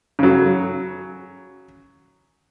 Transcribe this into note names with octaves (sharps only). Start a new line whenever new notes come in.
C#3 F#3